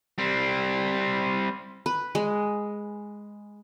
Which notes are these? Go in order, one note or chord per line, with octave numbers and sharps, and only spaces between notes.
G3 C4
B4
G#3